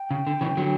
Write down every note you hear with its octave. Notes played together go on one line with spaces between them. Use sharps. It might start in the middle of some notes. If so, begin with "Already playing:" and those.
Already playing: G5
C#3
D3
C#3 E3
D3 F#3